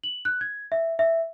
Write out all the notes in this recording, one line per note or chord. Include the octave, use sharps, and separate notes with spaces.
F#7
F#6
G#6
E5
E5